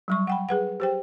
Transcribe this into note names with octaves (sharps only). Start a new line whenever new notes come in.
F#3 G3 C#6
F#5 G5 B5
G#4 B4 F#5
G4 C5 G5